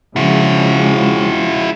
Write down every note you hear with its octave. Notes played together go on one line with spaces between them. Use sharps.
C#3 F3 G#3 E4 F#4